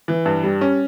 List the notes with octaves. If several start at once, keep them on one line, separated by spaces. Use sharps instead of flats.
E3
G2
G3
C#4